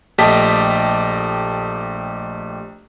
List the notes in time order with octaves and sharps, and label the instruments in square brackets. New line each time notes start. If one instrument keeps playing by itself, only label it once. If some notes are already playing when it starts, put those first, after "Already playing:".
[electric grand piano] A#1 A3 G4 D#5 A5 B6